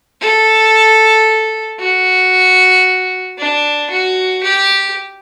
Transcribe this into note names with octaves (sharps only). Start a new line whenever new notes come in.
A4
F#4
D4
F#4
G4